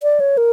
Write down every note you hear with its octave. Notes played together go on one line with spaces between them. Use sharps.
D5
C#5
A#4